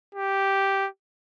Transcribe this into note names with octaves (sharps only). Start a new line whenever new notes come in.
G4